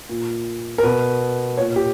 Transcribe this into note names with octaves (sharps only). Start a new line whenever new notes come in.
A#2
A#4
B2 B4
A#2 C#5
G4